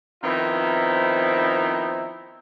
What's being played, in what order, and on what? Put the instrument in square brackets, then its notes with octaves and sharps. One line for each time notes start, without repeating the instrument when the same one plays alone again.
[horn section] D#3 F3 B3 C4 D#4 E4